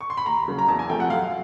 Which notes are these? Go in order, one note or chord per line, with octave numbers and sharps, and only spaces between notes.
C#6
C6
B5
D#2 A#5
C#3 F#3 A#3
A#5
E2 A5
G#5
C3 F3 A3 G5
F#5
F#2 F5